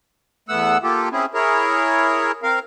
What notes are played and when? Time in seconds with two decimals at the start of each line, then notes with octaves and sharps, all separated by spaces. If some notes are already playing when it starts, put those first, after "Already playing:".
0.49 E2 A3 B3 F#5 E6
0.83 A#3 F4 G4 A4
1.12 C4 C#4 E4 G#4
1.34 E4 G#4 A#4 C#5
2.43 C4 A#4 F5